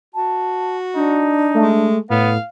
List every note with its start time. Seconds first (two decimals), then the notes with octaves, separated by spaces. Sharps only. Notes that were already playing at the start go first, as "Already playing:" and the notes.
0.15 F#4 A5
0.95 D4 D#4
1.54 G#3 A3
2.10 A2 B3 F5